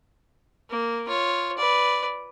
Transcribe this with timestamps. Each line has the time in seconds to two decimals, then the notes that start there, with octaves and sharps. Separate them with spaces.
0.70 A#3
1.09 F4 C#5
1.58 B4 D5